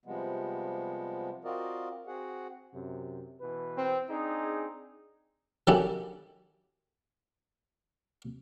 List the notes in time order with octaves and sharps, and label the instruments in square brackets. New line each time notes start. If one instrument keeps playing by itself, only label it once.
[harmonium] C3 F3 G3 G#3 B3
C4 F4 F#4 A#4 D5 D#5
C4 F#4 G#4 F#5
[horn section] F#2 C3
B2 E3 B4
[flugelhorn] C4
[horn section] C4 D4 G#4 [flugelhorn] D#4
[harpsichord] D#3 F#3 C#4 E4 G4 A4